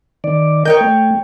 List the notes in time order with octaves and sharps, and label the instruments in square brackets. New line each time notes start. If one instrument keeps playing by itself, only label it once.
[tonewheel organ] D#3 D5
[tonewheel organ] A#4 D#5 [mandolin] C#5 G5 G6
[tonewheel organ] A3